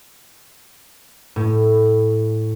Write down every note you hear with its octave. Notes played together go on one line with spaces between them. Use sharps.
A2